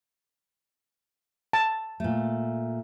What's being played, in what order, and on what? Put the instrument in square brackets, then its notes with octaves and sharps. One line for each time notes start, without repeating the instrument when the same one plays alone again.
[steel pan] A5
[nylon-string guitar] A#2 A3